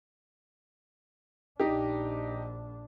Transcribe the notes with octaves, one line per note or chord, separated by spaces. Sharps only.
A#1 D4 D#4 G4